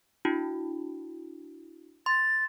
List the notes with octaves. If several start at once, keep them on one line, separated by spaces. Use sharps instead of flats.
D4 E4 F#4
C6 A6